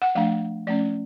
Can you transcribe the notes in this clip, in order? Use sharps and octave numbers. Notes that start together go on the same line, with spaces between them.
F#5
F3 A3 D4 F5
F3 A3 C#4 D5